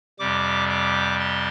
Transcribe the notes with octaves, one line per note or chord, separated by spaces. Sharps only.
F2 C3 G3 D6
D6
C6